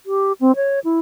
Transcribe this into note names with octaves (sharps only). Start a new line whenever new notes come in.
G4
C4
C#5
E4